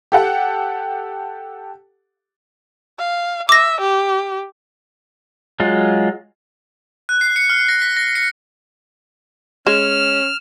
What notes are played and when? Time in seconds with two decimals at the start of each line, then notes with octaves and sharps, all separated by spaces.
0.12 G4 A4 F#5
2.99 F5
3.49 E5 D6 A#6
3.81 G4
5.60 F#3 G#3 F4
7.09 F#6
7.21 C7
7.36 C#7
7.50 F6
7.69 A#6
7.82 B6
7.97 A#6
8.15 C#7
9.67 G#3 C#4 F6 E7